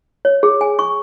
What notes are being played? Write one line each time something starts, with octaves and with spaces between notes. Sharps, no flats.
C#5
G#4
G#5
C#6